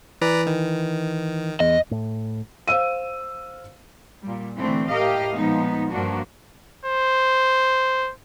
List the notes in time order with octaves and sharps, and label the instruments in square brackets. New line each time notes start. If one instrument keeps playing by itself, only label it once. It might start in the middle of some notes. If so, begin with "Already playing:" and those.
[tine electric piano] E3 [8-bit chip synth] B4 D5 A#5
[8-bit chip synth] D#3
[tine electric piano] E2 [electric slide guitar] D#5
[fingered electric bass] A2
[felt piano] C5 F5 E6 D#7
[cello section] A#2 G3
D3 E3 A3 C4 D4
A2 G4 A#4 D#5 F5
A#2 F3 G#3 B3 D#4
G2 F3 A#3 D4 F#4
[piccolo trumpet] C5